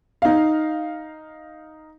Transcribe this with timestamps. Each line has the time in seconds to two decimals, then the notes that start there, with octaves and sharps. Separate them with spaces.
0.22 D#4 F5